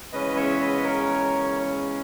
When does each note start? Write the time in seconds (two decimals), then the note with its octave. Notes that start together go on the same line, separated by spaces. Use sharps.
0.13 E2 C#3 G#3 C#4 B4 D#5
0.36 C#5 E5
0.60 B4 D#5
0.84 A#4 C#5